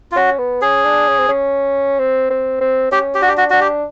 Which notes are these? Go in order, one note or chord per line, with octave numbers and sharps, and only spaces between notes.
F4
C#4 F#4
B3
C#4 G#4
D4
C#4
C4
C#4
C4
C4
C4
C#4 G4
G4
D4 F#4
G4
F#4
D4 F#4
G4